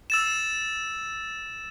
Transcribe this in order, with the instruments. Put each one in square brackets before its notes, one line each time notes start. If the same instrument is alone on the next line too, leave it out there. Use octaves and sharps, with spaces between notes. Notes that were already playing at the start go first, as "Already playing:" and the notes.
[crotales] E6 A6 E7